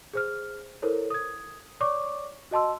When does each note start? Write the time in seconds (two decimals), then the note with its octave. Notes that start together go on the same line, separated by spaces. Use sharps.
0.13 G#4 C5 F6
0.82 E4 A4 A#4 C5 C#5
1.10 D#6 G#6
1.80 C#5 D5 C#6 D6
2.51 F#4 D#5 A5 C6 E6